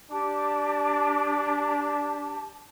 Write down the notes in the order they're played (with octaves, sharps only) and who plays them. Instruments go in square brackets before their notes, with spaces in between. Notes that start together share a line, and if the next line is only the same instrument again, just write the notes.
[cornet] D4 [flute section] G4 D6 [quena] A5